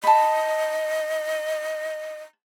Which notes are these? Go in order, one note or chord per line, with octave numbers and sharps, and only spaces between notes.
D#5 A5 B5